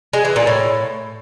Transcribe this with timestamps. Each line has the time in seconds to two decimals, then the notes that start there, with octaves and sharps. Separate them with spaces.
0.13 G#3
0.25 E3
0.36 A#2
0.47 A2